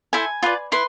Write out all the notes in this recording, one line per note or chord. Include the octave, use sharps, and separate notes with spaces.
E4 A4 C5 G#5
F4 B4 D5
E4 B4 C6